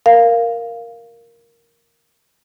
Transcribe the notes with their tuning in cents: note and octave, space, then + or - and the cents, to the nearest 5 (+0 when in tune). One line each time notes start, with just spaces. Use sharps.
A#4 +0 F5 -5